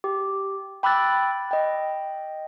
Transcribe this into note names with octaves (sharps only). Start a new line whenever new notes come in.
G4
G5 B5 D6 E6 F#6 A6
D#5 G5